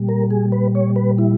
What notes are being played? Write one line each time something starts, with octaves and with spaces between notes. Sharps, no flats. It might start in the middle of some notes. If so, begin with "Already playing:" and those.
Already playing: A#2 G3
A#4
G#4
B4
C#5
B4
E4